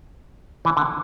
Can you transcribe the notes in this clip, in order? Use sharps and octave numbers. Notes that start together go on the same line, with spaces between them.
E3
D3